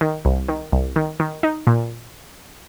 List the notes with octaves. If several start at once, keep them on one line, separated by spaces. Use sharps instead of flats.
D#3
C2
D#3
C2
D#3
D#3
D#4
A#2